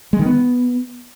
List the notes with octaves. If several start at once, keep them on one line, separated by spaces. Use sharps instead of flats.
G#3
D#3
B3